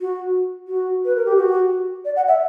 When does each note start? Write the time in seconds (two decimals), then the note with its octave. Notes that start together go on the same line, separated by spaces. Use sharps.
0.01 F#4
0.68 F#4
1.05 B4
1.16 A#4
1.26 G4
1.37 F#4
2.05 D5
2.16 F#5
2.28 E5